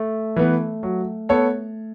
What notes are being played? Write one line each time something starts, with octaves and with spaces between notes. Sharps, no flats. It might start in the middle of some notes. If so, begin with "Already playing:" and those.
Already playing: A3
E3 B3
F#3
B3 A4 C#5